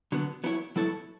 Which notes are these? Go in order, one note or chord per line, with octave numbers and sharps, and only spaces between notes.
D3 F#3 B3
F#3 B3 E4 A4 C#5
F#3 B3 E4 A4 C#5